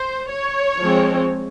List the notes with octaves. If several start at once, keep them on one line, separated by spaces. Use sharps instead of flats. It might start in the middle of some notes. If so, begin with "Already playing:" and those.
Already playing: C5
C#5
F3 G#3 C4